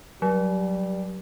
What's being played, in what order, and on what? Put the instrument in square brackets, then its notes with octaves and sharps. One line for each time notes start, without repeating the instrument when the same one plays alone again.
[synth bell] F#3 [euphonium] G3